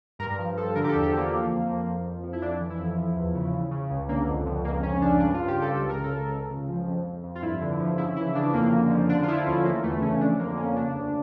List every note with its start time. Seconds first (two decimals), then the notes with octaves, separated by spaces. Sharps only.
0.19 G2 A#4
0.38 F3
0.57 F3 A4
0.75 D3 A#4
0.84 G4
0.89 A4
0.94 E2
1.03 G4
1.12 F3 A#3
1.31 F3
1.49 F2
1.68 F3
1.87 F2
2.06 F2
2.24 F3
2.33 E4
2.42 F2 D4
2.60 E3
2.70 E4
2.80 F2
2.98 F3
3.16 E2
3.35 C#3
3.53 C#3
3.71 C#3
3.90 C#2
4.09 D3 A#3
4.27 F2
4.46 F2
4.64 C#2 A#3
4.83 C#2 C#4
5.01 C#3 D4
5.20 G2 D4
5.34 F4
5.39 G2
5.48 G4
5.57 G2 A4
5.76 C#2 A4
5.89 A#4
5.94 C#3
6.04 A4
6.13 C#2
6.31 C#2
6.50 C#3
6.68 F3
6.87 F2
7.05 F2
7.24 F2
7.35 F4
7.42 G2 E4
7.61 D3
7.80 F3
7.98 C#3 E4
8.16 E3 E4
8.35 C#3 D4
8.53 F2 A#3
8.72 D3
8.90 F3
9.09 D3 D4
9.23 F4
9.28 F3 E4
9.46 D2 C#4
9.65 E3 A#3
9.83 E2 A3
10.02 C#3 C#4
10.21 F2 D4
10.39 D3 A#3
10.57 F2 C#4
10.76 C#3 D4
10.95 D2